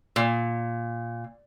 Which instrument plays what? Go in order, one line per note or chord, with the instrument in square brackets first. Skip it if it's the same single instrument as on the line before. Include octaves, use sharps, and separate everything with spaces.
[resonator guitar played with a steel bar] A#2